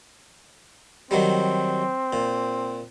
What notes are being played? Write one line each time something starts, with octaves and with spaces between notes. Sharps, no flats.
D#3 F#3 G3 C4
A#2